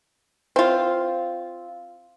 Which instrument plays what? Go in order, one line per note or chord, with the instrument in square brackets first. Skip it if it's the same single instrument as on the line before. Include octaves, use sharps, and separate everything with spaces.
[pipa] C4 F4